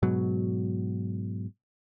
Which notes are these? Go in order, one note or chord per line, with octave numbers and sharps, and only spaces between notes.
G#2 B2 F#3